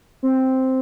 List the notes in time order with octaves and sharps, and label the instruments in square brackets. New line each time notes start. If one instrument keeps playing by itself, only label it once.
[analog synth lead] C4